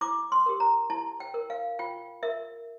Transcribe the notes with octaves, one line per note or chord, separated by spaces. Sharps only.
E4 D6
C6
G4 A#4
A#5
E4 A5
G5
A#4
F5
F4 G5
A#4 E5